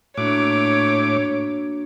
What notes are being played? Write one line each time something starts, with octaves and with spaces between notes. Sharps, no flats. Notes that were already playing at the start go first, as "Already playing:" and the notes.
A2 A#3 D4 F#4 C#5 D6